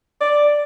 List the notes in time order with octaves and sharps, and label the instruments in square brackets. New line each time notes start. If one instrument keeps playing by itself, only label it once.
[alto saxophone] D5